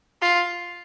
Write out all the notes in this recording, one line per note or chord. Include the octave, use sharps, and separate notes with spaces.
F4